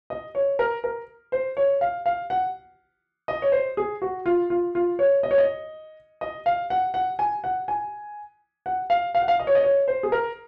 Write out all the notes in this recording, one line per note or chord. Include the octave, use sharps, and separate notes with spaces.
D#5
C#5
A#4
A#4
C5
C#5
F5
F5
F#5
D#5
C#5
C5
G#4
F#4
F4
F4
F4
C#5
D#5
C#5
D#5
D#5
F5
F#5
F#5
G#5
F#5
G#5
F#5
F5
F5
F#5
F5
D#5
C#5
D#5
C#5
C5
G#4
A#4